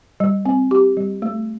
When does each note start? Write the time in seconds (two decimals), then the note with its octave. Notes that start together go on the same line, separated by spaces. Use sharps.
0.20 G3
0.46 C4
0.71 G4
0.97 G3
1.22 A3